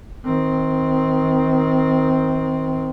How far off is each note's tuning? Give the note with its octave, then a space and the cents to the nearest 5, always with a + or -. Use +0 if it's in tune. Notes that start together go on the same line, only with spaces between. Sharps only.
D#3 +30 C4 +0